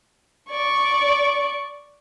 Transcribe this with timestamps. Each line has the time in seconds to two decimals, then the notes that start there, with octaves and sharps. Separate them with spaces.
0.51 D5 C#6